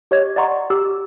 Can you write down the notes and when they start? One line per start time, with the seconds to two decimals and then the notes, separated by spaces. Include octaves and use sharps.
0.11 G4 C#5 D#5 G#6
0.36 D5 D#5 F#5 A#5 C6 C#6
0.70 G4 E6